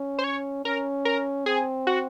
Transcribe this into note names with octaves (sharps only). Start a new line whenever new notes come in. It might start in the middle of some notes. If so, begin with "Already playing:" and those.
Already playing: C#4
C5
C#5
C#4 A#4
A#4
C4 G#4
F#4